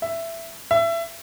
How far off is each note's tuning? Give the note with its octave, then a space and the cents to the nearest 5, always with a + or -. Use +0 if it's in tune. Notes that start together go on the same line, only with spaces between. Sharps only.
E5 +10
E5 +25